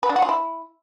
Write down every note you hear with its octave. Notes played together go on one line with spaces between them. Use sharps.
B4
D4
F#4
F4
E4